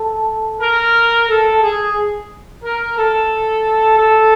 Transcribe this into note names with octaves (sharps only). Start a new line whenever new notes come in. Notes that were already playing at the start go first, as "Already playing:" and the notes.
Already playing: A4
A#4
A4
G#4
A#4
A4
A4